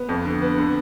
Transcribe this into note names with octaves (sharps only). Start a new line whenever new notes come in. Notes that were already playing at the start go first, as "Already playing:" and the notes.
Already playing: B3
F2
D3
B3
D3